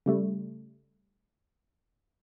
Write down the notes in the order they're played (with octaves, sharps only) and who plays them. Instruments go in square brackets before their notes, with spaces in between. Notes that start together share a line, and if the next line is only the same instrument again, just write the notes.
[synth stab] C#3 G3 A3